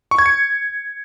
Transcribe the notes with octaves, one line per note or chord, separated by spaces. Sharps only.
C#6
G#6
C#7